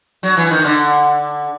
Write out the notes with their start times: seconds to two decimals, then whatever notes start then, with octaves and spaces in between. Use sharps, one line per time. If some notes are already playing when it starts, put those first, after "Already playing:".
0.23 F#3
0.37 E3
0.51 D#3
0.65 D3